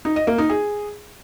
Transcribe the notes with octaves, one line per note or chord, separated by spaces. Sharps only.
D#4
D#5
A#3
D#4
G#4